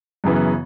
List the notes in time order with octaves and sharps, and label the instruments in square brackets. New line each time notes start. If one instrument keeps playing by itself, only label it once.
[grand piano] F#2 C#3 E3 B3